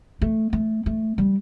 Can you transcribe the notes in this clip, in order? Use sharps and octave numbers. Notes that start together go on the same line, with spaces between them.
A3
A3
A3
G3